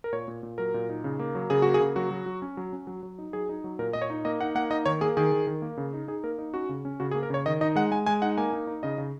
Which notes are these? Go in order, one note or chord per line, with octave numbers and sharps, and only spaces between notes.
A#4
A#2 C#5
A#2
A#2
F#3 A#4
A#2
D#4
C#3
A#3
F#3
C#3 G#4
A#3 F#4
G#4
C#3
F#3 F#4
F#3
F#3
C#4
F#3
C#4
F#3
F#3
D#4
F#3 G#4
D#4
F#3
A#2 A#4
A#2 D#5
C#5
D#4
A#3 D#5
D#4 F#5
A#3 F#5
D#4 D#5
D#3 C#5
A#3 G#4
D#3 G#4
D#3
D#3
A#3
C#3
D#4
D#4 G#4
A#3 A#4
D#4
C#4 F#4
C#3
C#4
C#3 F#4
G#4
A#3
A#4
C#3 C#5
D#3 D#5
D#4 D#5
G#3 F#5
G#3 G#5
G#3 G#5
D#4 F#5
A#3 G#5
D#4
D#4
C#3 D#5
C#3